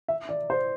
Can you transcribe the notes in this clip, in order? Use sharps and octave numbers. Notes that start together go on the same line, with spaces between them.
E5
D5
C5